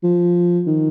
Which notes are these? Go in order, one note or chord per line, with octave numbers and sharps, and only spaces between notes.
F3
D#3